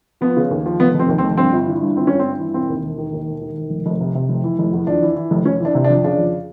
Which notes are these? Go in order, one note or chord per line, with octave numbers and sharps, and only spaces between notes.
F3 B3
C#3
D#2
F3
F1 B3
F1
C4
D#2
C4
F1
G2 C4
G1
E3
G2
G1 C4
G1 C#4
C4
G2
E3
E1 C4
D#2
E1
D#3
D#2
E1
D#3
E1
F1
F1
C3
C3
F1
E3
F1
E2
F2 D4
E3
E3
F1
F1 C#4
E3 D4
C3
D4
F2
C#3 D4
F2